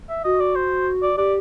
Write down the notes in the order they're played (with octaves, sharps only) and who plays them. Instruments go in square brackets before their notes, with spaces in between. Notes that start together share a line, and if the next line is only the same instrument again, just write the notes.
[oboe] E5
[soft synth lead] F#4 [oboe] D#5
[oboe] D5
C5
D5
[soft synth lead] G4 [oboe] D5